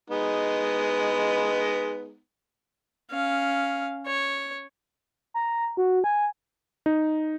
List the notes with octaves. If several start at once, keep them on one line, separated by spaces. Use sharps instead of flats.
G#3 B3 D#4
C#4 F5
C#5
A#5
F#4
G#5
D#4